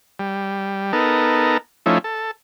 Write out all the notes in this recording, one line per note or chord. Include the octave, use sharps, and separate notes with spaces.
G3
B3 D#4 A4 A#4
F3 A3 C#4 D#4 E4
A4